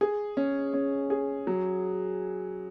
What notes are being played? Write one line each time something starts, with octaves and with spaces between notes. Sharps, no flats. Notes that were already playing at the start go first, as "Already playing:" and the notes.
G#4
C#4
C#4
G#4
F#3